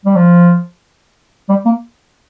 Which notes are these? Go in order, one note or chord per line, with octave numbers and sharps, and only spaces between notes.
G3
F3
G3
A#3